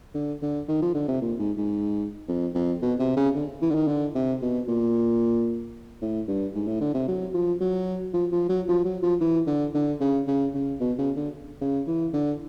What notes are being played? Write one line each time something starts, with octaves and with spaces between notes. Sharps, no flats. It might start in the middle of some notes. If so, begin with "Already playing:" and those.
D3
D3
D#3
F3
D3
C3
A#2
G#2
G#2
F2
F2
B2
C3
C#3
D3
E3
D3
D#3
D3
C3
B2
A#2
A2
G2
G#2
A2
D3
C3
F#3
F3
F#3
F3
F3
F#3
F3
F#3
F3
E3
D3
D3
C#3
C#3
C#3
B2
C#3
D3
C#3
E3
D3